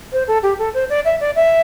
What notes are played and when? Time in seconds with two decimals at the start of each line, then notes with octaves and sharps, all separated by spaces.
0.13 C5
0.28 A4
0.43 G4
0.59 A4
0.74 C5
0.90 D5
1.05 E5
1.20 D5
1.36 E5